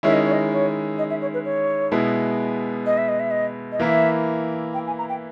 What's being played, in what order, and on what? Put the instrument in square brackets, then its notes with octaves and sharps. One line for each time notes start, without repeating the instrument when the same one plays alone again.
[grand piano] D#3 G#3 C#4 E4 [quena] E5
[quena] D#5
C#5
D#5
C#5
D#5
E5
C#5
B4
C#5
[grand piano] B2 G#3 B3 E4
[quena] D#5
E5
D#5
E5
D#5
D#5
[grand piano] E3 A#3 E4 [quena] E5
[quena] G5
G#5
A#5
G5